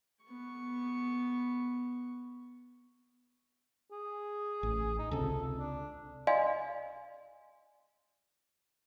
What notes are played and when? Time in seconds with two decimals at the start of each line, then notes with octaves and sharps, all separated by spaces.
0.25 B3 C#6
3.92 G#4
4.63 A1
4.99 D#4
5.11 C#2 C3 A4
5.58 D4
6.27 D5 D#5 F5 G#5 C6